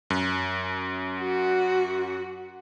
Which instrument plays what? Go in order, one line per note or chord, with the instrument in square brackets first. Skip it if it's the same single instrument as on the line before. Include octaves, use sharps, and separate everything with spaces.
[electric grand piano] F#2
[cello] F#4